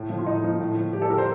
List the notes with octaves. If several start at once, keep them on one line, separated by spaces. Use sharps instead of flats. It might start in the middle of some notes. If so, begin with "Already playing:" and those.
Already playing: A2
F3
F4
A2 D#4
F3
A2
F3
A2 G4
A4
F3 A#4
C5